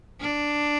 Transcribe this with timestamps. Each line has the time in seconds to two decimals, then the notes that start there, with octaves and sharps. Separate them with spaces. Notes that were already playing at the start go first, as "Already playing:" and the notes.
0.21 D4